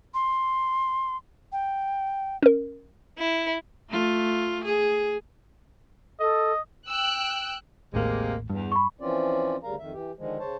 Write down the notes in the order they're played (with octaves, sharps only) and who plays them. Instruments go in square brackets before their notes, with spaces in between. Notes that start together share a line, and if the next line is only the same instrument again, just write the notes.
[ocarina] C6
G5
[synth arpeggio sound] C#4 A#4
[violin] E4
[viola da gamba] A3 F4
G#4
[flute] A4 [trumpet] D#5
[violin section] G5 E6 F#6
[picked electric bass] A1 D#2 A2 [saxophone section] C3 G#3 A#3
[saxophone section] E2 [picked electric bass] G2
[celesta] B5 C#6
[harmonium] E3 F3 C4 C#4 F4 D5
D2 C#3 G3 A#4 F5 A#5
F2 D#3 E5
E3 G4
D3 D#3 F3 G#3
C#3 C5 C#5 A5